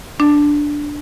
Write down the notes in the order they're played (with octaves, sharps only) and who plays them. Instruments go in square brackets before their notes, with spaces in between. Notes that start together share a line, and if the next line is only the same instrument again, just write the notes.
[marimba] D4